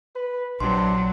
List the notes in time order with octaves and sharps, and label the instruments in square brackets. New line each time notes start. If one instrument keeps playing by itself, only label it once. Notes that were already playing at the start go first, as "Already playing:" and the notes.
[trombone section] B4
[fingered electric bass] A#1 [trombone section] C3 D4 [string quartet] F#3 [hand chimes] C6